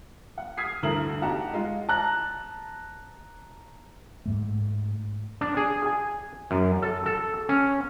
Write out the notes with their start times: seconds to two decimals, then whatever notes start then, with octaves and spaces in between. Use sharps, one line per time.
0.38 F#5
0.57 D#6 F6 G#6 B6 C7
0.83 D2 G2 A3 E4 A#4 F#7
1.22 D#4 F#4 G4 F#5 A5 A#5
1.53 G#3 F4
1.89 A5 A#5 F#6
4.26 G#2 A3
5.41 D4
5.57 G#4
5.86 G#5
6.51 F#2
6.82 A4
7.06 A4
7.49 C#4